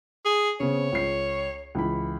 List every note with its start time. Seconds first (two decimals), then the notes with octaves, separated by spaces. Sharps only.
0.25 G#4
0.60 C#3 B3 C4 C#5
0.92 C#2 C7
1.75 C#2 E3 B5